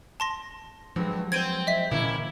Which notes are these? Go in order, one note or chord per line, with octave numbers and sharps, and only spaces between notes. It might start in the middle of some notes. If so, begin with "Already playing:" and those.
A5 C6 A#6
G2 F3 F#3 G#3
C4 C5 G#6 D7 D#7
D#5 E5 B6
A#2 D3 E3 A#3 C#4 E4